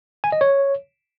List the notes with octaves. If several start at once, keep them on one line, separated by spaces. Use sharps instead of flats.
G#5
D#5
C#5